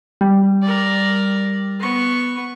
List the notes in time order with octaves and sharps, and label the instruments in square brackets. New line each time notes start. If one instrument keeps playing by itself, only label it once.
[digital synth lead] G3
[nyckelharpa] A#4 D5
B3 C#6